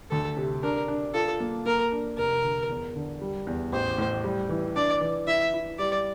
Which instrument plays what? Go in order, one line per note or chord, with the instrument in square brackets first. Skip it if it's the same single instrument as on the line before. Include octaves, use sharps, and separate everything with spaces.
[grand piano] D2 [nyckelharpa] A4
[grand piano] C3
[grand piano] D4 [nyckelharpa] A#4
[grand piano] D4
[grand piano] F4 [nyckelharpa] A4
[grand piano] A#3
[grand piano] A#3 [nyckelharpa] A#4
[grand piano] D4
[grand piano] F1 [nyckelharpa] A#4
[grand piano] D3
E2
D3
G3
E2
[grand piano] A1 [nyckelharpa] C5
[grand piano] A2
G3
E3
[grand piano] D4 [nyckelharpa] D5
[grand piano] E3
[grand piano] E4 [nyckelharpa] E5
[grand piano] E4
[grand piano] G3 [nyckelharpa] D5